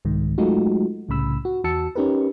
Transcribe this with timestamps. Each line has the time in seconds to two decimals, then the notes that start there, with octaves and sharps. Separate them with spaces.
0.05 C2 G#2 D#3
0.38 F#3 G#3 A3 D#4 F4 F#4
1.09 C2 A2 C#3 B5 E6
1.45 F#4
1.64 E2 F#4 A5 E6 C#7
1.95 C#4 D#4 G4 A#4 B4